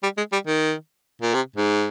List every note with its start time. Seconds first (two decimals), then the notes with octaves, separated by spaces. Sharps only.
0.03 G3
0.17 G#3
0.32 G3
0.47 D#3
1.22 A#2
1.34 C3
1.56 G#2